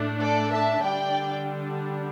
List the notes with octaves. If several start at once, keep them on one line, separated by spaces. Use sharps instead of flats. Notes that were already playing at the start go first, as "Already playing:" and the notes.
Already playing: A2 A3 D4
A4 D5
E5 A5
D3 G3 D4 D5 G5